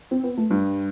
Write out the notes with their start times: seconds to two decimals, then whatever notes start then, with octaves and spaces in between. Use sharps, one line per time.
0.11 C4
0.24 B3
0.37 A3
0.50 G2 G3